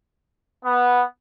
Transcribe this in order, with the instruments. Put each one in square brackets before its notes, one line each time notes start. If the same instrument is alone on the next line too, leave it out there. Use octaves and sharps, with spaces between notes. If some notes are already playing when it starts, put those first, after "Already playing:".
[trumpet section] B3